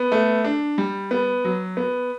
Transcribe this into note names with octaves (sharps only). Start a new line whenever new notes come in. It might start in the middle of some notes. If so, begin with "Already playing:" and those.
Already playing: B3
A3
D4
G3
B3
F#3
B3